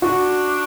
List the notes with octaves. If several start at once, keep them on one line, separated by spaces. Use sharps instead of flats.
D4 F#4